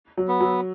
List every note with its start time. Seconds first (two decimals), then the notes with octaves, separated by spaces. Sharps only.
0.17 F#3
0.28 B3
0.41 F#3